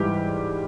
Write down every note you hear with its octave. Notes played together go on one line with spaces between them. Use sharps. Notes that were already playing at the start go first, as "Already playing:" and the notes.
Already playing: G#2 E3 G3 G4